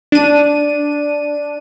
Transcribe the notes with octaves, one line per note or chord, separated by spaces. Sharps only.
D4 D#7